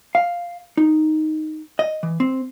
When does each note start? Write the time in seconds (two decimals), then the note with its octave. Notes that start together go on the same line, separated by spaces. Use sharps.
0.15 F5
0.77 D#4
1.79 D#5
2.03 E3
2.20 C4